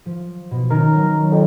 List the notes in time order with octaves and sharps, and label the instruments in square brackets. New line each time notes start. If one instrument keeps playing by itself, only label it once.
[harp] F3
B2
[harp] D#3 C#4 D#4 [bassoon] A#4
[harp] F#3 A#6
[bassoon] F2